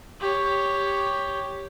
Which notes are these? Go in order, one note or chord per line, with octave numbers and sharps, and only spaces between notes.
G4 C#5